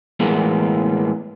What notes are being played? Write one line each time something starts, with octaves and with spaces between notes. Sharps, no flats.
A2 E3 G#3 A#3 B3